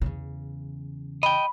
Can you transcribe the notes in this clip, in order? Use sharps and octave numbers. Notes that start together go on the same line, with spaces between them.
E2 C#3
D#5 G5 B5